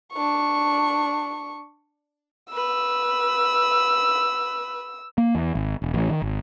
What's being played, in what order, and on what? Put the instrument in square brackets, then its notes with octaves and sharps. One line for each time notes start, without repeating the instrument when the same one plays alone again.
[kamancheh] D4 C#6
[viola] B4 [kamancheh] E6
[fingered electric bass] A#3
E2
G#1
E1
A1
D#3
G#1